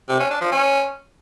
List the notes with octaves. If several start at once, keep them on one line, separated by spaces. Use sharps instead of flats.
C3
C#4
D4
F3
C#4